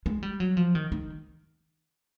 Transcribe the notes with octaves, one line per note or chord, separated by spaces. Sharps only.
G#3
G3
F#3
F3
D#3
D#3